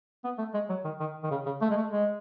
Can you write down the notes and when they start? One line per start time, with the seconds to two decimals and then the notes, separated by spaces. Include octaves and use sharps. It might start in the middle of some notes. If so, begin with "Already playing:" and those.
0.24 B3
0.38 A3
0.54 G#3
0.69 F#3
0.84 D#3
1.00 D#3
1.23 D#3
1.31 C#3
1.46 C#3
1.61 A3
1.71 G#3
1.77 A3
1.91 G#3